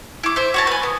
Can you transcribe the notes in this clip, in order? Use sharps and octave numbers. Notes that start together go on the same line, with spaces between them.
E4 D6
C5 E5
F#4 C#5 A5
B4 G#5
B3